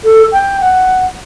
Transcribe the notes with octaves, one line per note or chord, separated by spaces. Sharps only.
A4
G5
F#5